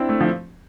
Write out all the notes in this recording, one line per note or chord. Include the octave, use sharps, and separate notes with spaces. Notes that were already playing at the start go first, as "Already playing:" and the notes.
Already playing: C4 D4 E4
A3
F3